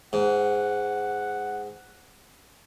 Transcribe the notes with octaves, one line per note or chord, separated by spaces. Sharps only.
G#2 F#5